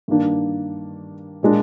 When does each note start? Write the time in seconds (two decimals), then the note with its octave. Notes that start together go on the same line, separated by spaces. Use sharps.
0.08 G2 D#3 A#3 D4
1.43 A#2 G#3 D4